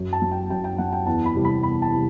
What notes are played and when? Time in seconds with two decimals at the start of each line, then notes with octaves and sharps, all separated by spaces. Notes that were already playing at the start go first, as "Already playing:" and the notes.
Already playing: F#2
0.13 A5
0.22 F#3
0.31 G5
0.50 F#2 G5
0.64 G5
0.78 F#3 F#5
0.92 G5
1.06 E2 A5
1.25 B5
1.35 C3 E3 G3
1.45 B5
1.63 E2 B5
1.82 A5
1.92 C3 E3 G3